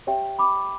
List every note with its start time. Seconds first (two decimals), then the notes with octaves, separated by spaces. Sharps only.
0.07 G4 C#5 E5 G5
0.39 B5 D6